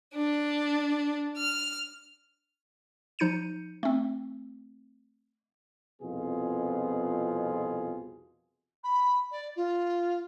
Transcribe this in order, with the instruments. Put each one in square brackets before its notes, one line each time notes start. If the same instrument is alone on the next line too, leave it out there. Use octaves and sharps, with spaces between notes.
[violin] D4
F6
[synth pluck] F3 D#4 G6 C#7 D#7
A3 C4
[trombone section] C2 F2 B2 B3 F4 G#4
[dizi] B5
D5
F4